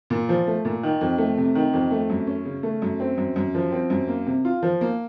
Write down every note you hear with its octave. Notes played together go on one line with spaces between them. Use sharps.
A#2
F3
A3
A#2
D#3
F2
A3
C3
D#3
F2
A3
F#2
C#4
C#3
A3
F#2
C4
F#2
F#2
F3
C4
F#2
A#3
C3
F4
F3
A#3